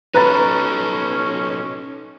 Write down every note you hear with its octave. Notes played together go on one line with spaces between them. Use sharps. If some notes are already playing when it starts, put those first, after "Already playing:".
C#4 D#4 F#4 A4 B4 A#5 A6